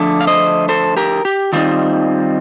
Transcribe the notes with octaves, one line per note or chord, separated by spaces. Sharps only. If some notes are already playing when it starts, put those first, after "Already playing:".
Already playing: D3 F3 A3 D4
F5
C5 D#5
A4 C5
G4 A#4
G4
D#3 G3 C4 D#4 F4